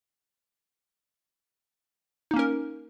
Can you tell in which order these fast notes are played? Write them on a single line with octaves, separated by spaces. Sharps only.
D#4 A#3 C#4 A#4